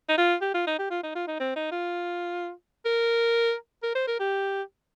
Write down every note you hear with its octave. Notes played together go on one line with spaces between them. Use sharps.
D#4
F4
G4
F4
D#4
G4
F4
D#4
F4
D#4
C4
D#4
F4
A#4
A#4
C5
A#4
G4